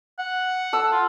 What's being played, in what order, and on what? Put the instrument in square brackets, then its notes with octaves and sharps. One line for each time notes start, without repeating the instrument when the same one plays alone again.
[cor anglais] F#5
[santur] A4 E6
[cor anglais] F4